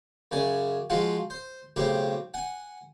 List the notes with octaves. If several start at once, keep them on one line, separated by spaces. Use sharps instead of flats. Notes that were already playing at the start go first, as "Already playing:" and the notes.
F#2 C#3 D5 G#5
F3 G#3 F4 F#4
C5
B1 A2 C#3 C4 G4 G5
F#5 G#5